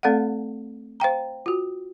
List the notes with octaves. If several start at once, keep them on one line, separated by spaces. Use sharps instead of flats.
A3 C4 A4 D5 F5 F#5
C5 F5 G5 A#5
F4 F#4